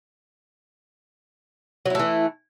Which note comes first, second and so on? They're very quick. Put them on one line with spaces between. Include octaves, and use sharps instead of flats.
F#3 E4 A3 E3